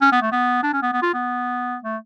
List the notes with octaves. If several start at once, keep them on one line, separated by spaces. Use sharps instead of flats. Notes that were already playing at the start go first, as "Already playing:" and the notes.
C#4
B3
A3
B3
D4
C#4
B3
B3
F4
B3
A3